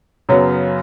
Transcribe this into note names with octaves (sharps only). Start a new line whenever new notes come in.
F#2 C#3 F#3 B3